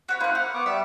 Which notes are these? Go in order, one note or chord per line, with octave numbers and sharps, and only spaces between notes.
F#4 C#5 B5
A#3 C#4 E4 C5 F#6
F#5 F6
B3 C#6 D6
G3 E5